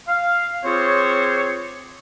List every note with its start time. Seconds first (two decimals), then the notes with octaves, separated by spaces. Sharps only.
0.07 F5
0.64 C4 F4 G4 G#4 C5 C#5